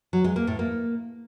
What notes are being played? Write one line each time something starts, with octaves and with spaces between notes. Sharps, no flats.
F#3
G#3
A#3
A2
A#3